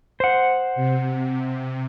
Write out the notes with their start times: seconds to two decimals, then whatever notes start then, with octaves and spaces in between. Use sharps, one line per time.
0.20 C5 F#5
0.75 C3